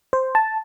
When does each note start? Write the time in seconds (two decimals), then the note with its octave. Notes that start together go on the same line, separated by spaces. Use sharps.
0.13 C5
0.35 A5